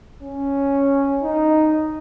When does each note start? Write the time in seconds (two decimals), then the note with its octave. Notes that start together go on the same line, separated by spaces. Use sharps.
0.23 C#4
1.23 D#4